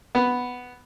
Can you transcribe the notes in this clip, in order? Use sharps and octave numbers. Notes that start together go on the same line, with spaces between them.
B3